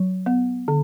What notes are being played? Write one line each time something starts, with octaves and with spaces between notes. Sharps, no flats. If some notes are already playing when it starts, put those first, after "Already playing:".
Already playing: F#3
B3
D3